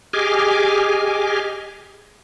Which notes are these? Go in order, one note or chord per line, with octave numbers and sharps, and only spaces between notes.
G4 G#4 D#5 G#5 D6 F6